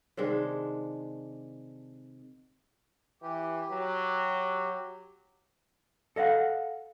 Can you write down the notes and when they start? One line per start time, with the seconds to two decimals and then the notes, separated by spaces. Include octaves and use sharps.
0.17 C3 D#3 G#3 D4
3.22 E3 G4
3.71 F#3
6.16 A4 D#5 F5 F#5